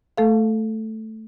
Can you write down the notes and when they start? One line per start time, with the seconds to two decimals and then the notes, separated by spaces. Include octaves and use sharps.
0.18 A3 A4 F5